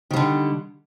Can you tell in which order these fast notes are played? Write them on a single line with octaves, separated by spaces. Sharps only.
D#3 G3 D3